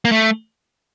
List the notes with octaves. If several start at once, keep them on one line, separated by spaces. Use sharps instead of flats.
A#3
A3